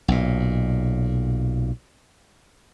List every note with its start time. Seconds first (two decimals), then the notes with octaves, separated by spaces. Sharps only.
0.08 B1 A#2